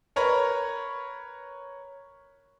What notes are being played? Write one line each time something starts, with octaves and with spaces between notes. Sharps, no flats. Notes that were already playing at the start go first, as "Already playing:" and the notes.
A#4 B4 C#5 A#5 B5